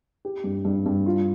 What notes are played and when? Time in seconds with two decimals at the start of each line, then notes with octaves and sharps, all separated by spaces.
0.25 G4
0.44 G2
0.65 G2
0.86 G2
1.06 F4